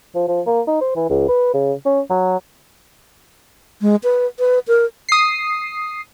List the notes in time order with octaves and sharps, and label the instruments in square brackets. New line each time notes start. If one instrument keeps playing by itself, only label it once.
[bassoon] F3
F3
A#3
D#4
C5
E3
C#2
B4
C#3
C#4
F#3
[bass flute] G#3
B4
B4
A#4
[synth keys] D#6 C7